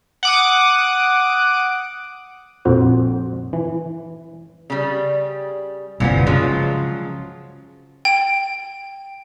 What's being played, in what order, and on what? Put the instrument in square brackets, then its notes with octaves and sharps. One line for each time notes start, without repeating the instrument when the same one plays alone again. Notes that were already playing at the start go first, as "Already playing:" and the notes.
[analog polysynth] F#5 D6 D#6
[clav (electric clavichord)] A#1 F2 F#4 C5
E3
[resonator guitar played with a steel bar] C#3 G3
[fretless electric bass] G1 C2 [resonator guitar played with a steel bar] A#2 F3 B3
[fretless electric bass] C#3 [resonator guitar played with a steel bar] F3 F#3 G#3
[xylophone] G5